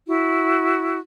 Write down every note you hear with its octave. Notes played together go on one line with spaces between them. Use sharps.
E4 F#4